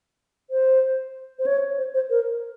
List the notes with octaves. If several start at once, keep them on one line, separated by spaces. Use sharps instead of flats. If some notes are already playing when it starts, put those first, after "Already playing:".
C5
C5
C#5
C5
C5
A#4